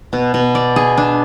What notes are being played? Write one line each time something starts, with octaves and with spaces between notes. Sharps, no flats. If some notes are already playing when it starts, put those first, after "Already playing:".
B2
B2
D5
G#4
D4